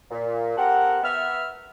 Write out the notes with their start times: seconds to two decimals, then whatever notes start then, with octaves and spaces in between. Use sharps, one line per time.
0.10 A#2
0.56 C4 G4 A4 A#4 F#5
1.03 B3 E5 F6